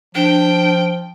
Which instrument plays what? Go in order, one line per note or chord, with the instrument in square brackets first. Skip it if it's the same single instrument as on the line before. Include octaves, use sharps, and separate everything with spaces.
[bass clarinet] F3 [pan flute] D4 [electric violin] G5